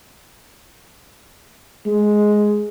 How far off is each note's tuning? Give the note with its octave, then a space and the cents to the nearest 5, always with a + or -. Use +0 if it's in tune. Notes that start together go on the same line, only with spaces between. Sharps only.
G#3 +10